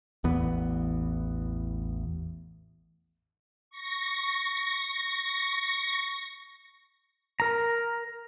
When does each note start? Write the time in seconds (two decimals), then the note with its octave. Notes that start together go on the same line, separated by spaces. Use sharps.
0.24 A1 E2 E3 B3
3.70 C#6 A#6
7.40 A#4 A#5